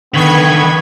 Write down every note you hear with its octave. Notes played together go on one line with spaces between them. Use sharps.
D3 D#3 B3 C#6 G#6 B6